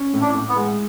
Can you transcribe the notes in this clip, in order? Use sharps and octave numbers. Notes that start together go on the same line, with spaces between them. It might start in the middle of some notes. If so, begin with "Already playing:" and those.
Already playing: C#4
A2
D4
A2
B3
G#3